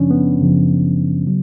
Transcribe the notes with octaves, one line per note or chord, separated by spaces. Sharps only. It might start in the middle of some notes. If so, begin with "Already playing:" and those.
Already playing: F#2 C#3 F3 C#4 D4
B3
F#2 C#3 F3
C#3 F#3